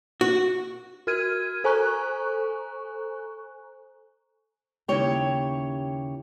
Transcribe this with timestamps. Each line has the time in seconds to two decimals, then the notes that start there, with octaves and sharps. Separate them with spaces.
0.21 F#4
1.07 F#4 A#4 F6 G#6 D#7
1.64 A4 C5 G#5 A#5 C#6 F#6
4.88 D#2 C#3 E4 G4 C#5 G5